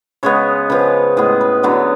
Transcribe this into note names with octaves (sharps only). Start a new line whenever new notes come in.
C#3 G#3 B3 C#5
C#3 F3 B3 B4
A2 G#3 B3 G#4
B4
D3 F#3 B3 C#5